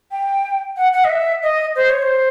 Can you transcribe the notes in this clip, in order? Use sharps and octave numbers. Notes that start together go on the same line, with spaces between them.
G5
F#5
F#5
D#5
E5
D#5
C5
C#5
C5